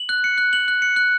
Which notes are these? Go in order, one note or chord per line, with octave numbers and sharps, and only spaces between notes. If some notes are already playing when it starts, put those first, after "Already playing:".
Already playing: F#7
F#6
C#7
F#6
F#7
F#6
C#7
F#6